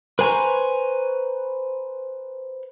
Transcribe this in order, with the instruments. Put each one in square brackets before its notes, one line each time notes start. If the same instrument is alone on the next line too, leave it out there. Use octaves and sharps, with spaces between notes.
[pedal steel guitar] B4 C5 G#5 A#5 C#6